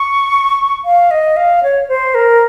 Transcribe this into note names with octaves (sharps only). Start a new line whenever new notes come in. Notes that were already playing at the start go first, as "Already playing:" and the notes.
Already playing: C#6
F5
D#5
F5
C#5
C5
A#4